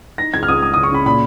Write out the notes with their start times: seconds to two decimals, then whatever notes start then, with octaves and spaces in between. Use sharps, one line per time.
0.18 D#4 A#6
0.33 C#2 G#6
0.43 F6
0.48 C#2 D#6
0.62 G#3 D#6
0.74 D#6
0.76 C#3
0.83 C#6
0.92 C#3 B5
1.06 A#2 B5